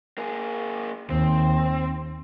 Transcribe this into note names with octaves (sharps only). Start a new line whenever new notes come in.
A#3 G#4
D#2 C4